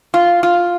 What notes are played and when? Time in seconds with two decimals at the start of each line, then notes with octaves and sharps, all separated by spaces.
0.14 F4
0.43 F4